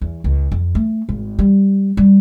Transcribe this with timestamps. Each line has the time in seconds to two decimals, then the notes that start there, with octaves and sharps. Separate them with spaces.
0.01 E2
0.24 C#2
0.52 F2
0.75 A3
1.09 G#1
1.39 G3
1.97 G3